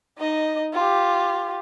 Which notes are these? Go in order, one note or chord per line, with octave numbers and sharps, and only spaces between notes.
D#4 D#5
F4 G4